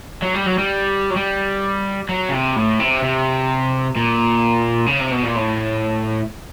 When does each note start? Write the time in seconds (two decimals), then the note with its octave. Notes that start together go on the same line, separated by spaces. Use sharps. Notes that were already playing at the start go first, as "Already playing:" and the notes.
0.22 F#3
0.34 G3
0.46 F#3
0.58 G3
1.10 F#3
1.16 G3
2.09 F#3
2.29 C#3
2.32 C3
2.56 A2
2.80 C3
3.03 C3
3.96 A#2
4.86 C#3
4.99 C3
5.11 B2
5.23 A#2
5.36 A2